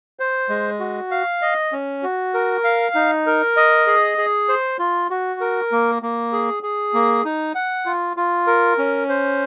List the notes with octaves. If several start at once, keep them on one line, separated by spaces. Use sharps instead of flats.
C5
G#3
F#4
F5
D#5
C#4
F#4
A#4
F5
D#4
A#4
D#5
G#4
G#4
C5
F4
F#4
A#4
A#3
A#3
G#4
G#4
A#3
D#4
F#5
F4
F4
A#4
C#4
C5